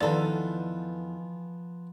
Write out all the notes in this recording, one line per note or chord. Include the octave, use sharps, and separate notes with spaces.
E2 D#3 F3 B3 D#4 F4 A4 D5